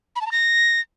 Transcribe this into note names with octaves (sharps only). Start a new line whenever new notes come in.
B5
A5
A#5
A#6